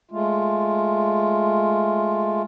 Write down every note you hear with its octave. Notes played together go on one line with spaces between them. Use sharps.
G#3 A3 F4